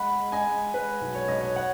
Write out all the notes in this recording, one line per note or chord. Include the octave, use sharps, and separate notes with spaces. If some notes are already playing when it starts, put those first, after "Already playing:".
Already playing: G#3 F#5 B5
G#3
D#5 G#5
G#3
G#3 B4
B1
C#5
B1 D#5
C#5
C#5 F#5